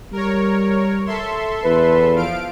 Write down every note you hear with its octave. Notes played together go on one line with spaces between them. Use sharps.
G3 A#4 C#5
A4 E5 C6
E2 B4
F3 F5 D7